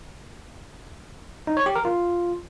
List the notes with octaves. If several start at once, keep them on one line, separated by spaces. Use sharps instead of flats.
D#4
C#5
G4
A#4
F4